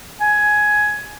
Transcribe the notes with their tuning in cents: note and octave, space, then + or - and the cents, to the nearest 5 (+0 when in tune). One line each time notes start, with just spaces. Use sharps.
G#5 +15